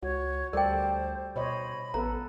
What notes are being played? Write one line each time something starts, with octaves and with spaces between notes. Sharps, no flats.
C#2 F#4 C#5
D2 G3 A4 A#4 C5 D5 G5
B2 C5 C#5 D#5 B5
A1 B3 A4 B4 A#5